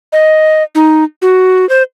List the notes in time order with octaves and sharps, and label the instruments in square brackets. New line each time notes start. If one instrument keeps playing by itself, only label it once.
[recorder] D#5
D#4
F#4
C5